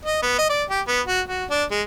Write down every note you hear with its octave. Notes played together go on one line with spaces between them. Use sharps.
D#5
B3
D#5
D5
G4
B3
F#4
F#4
D4
G#3